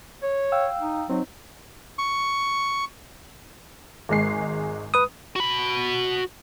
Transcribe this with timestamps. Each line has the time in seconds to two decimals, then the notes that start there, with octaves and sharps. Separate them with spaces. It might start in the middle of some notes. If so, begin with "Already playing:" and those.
0.23 C#5
0.52 F5 G5 E6
0.81 D#4
1.10 F#3 C4 D#4
1.98 C#6
4.09 G#1 G#3 C7
4.94 B4 D#6
5.36 F#4 B5